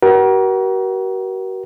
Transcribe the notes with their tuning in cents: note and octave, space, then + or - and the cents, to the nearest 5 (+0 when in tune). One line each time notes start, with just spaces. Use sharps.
F#4 +40 A#4 +35